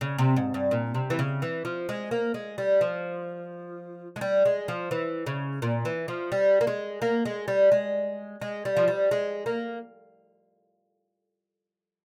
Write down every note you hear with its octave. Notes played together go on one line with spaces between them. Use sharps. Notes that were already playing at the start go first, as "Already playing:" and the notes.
C#3
C3
G#2
G2
A#2
C3
E3
C#3
E3
F3
G#3
A#3
G#3
G3
F3
G#3
G3
G#3
F3
E3
C#3
A#2
E3
F3
G3
A#3
G#3
A#3
G#3
G3
G#3
G#3
G3
F3
G3
G#3
A#3